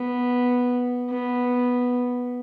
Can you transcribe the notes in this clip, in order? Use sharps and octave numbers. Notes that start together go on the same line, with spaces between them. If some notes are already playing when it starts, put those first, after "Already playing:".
Already playing: B3
B3